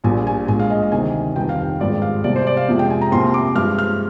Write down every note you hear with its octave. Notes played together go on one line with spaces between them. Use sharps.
A#1 A#2 G3 A#3 G#5
G#5
A#1 A#2 G#3 G#5
F5
D#5
F5
D2 C3 D#3 G#5
F1 F2 D#3 G3 G5
F5
G5
G#1 G2 F3 G#3 D5
F5
C2 C3 G3 D5
C5
D5
F5
F2 C3 F3 G#3
G5
G#5
A#5
C2 C3 F3 A#3 C6
D6
G2 F3 G#3 F6
F6